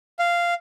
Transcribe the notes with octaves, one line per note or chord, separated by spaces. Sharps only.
F5